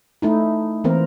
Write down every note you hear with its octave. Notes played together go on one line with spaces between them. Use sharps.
A3 D#4 E4
E3 A#3 C4 A#4